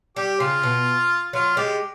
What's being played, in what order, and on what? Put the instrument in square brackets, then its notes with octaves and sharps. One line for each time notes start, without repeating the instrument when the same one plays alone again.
[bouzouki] G3 [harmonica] G4
[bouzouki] C#3 [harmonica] F4
[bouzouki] B2
[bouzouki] F#3 [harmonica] F4
[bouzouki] G#3 [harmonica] G4